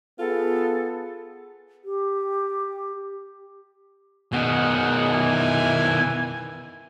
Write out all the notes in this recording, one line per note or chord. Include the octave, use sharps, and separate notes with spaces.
B3 F4 G#4 A4
G4
B2 D#3 G#4 F#5
E3 G#5